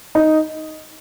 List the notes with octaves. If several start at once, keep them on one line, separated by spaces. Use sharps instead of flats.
D#4